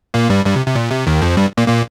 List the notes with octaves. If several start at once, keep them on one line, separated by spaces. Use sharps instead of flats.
A#2 A#3
G2 G3
G2 G3
C3
C3
A#2
C3
D#2 D#3
F2 F3
G2 G3
A#2 A#3
A#2 A#3